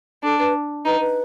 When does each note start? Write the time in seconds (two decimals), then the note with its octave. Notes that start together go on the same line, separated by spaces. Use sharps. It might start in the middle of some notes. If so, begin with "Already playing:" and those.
0.24 D4 A4
0.39 B4
0.85 D#4 B4
1.01 B4